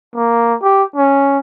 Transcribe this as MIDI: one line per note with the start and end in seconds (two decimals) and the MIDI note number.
0.15 0.55 58
0.63 0.83 67
0.96 1.39 61